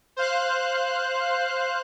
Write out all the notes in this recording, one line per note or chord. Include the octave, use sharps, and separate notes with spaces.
C5 F5 F#6